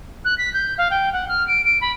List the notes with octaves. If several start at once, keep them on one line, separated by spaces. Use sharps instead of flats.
F#6
B6
G6
F5
G5
F#5
F6
D7
D7
B5